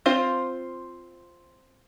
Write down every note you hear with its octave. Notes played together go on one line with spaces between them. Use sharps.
C4 F4 C5